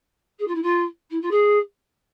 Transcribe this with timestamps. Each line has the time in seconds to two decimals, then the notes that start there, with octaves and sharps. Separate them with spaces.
0.39 G#4
0.47 F4
0.54 E4
0.62 F4
1.10 E4
1.21 F4
1.30 G#4